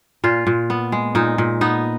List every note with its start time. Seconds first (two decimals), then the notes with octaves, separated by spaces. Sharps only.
0.24 A#2 F4
0.47 A#2
0.70 B3
0.92 G#3
1.15 A#2 D#4
1.38 A#2
1.61 B3 D#4